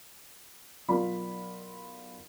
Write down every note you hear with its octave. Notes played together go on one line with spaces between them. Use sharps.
B1 F4 A#4 D5 B5